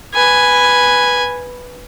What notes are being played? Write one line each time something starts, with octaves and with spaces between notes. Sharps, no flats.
B4 G#5